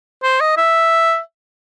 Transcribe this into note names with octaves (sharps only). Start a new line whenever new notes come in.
C5
D#5
E5